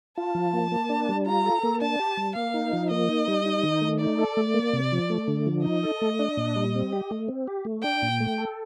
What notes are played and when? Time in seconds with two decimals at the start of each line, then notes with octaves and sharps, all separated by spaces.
0.18 F4 A5
0.35 F3
0.53 A#3
0.72 A#3
0.89 D4
1.09 G3
1.26 F4 A#5
1.45 A4
1.63 A#3
1.81 D4 A5
1.99 G4
2.17 G3
2.36 A#3 F5
2.54 D#4
2.73 F3
2.91 A#3 D#5
3.08 D#4
3.28 G3
3.46 D#4
3.63 D#3
3.81 A3
4.00 D#4 D5
4.18 A4
4.37 A3
4.54 A#3
4.73 C3
4.92 F3
5.10 A3
5.28 D3
5.46 F3
5.64 D#4 D#5
5.83 A4
6.01 A3
6.19 D4
6.37 A#2
6.56 G3
6.74 C4
6.92 G4
7.11 A3
7.28 C4
7.47 G4
7.65 A3
7.83 D4 G5
8.02 A#2
8.20 A3
8.38 A4